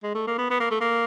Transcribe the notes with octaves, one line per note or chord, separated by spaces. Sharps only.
G#3
A3
A#3
B3
B3
A#3
A3
A#3